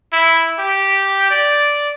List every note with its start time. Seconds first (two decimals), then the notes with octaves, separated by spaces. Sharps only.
0.12 E4
0.59 G4
1.31 D5